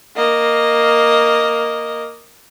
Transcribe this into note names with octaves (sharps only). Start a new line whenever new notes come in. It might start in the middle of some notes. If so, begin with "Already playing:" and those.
A#3 D#5